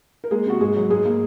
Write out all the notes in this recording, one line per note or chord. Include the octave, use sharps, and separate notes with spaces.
A#4
G#3 A#3 G#4
C3 F#4
G#2 G#3 G#4
F#3
G#2 G#3 G#4
A#3